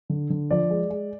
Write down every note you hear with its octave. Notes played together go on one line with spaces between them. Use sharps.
D3
D3
F3 D5
G#3
G#3